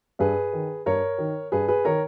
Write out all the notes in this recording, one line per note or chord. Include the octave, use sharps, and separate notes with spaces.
G2 G#4 B4
D#3
G2 A#4 C#5
D#3
G2 G#4 B4
G#4 B4
D#3 A#4 C#5